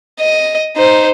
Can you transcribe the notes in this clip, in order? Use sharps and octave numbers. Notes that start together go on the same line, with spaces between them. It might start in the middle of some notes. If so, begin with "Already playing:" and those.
D#5
D#4 C5